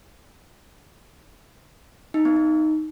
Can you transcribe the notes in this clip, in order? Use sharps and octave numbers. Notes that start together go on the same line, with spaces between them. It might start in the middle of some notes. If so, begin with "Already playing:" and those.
D#4
B3
D#4